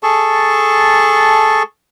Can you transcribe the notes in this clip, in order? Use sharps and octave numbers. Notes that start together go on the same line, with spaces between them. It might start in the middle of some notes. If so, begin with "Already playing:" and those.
G#4 A4 A5 C#6